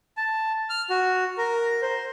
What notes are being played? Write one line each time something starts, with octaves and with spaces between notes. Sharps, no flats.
A5
F6
F#4
A#4
C5